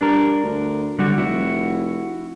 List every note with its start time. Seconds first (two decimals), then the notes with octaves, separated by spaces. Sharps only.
0.01 G2 D4 A#4
0.43 D2
0.99 D3 G3 F#4
1.18 F1 E4 F#4